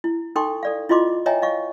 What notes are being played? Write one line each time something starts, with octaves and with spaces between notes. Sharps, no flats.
E4
D#4 A4 G5 C6 C#6
A4 D5 F5
E4 F4 D#5 C6 D6
C#5 D#5 E5 G5 G#5 A#5
D#5 F5 C#6